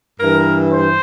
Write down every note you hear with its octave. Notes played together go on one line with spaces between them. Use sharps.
G2 E3 A#4
C5